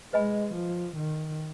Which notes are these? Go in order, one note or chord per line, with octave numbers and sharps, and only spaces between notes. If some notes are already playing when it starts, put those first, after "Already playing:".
G#3 B4 D#5 G#5 B5
F3
D#3